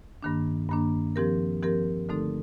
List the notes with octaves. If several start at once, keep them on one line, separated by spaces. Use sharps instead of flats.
G2 D#3 A#3 D4
G2 D#3 A#3 D4
F3 C4 G4 A#4
F3 C4 G4 A#4
D3 A3 C4 D#4 A4